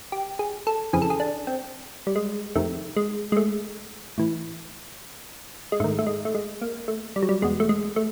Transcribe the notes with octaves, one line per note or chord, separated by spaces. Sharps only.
G4
G#4
A4
F2 C#3 E3 G#4
A4
G#4
D4
C4
G3
G#3
F2 C3 D#3 A3
G#3
G#3
A3
A2 E3
G#3
G#2 D#3 A3
A3
G#3
A3
G#3
A#3
A3
G3
F#3
G3
E2 B2 G#3
A3
G#3
A3